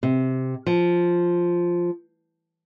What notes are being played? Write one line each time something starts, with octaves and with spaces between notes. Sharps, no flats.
C3
F3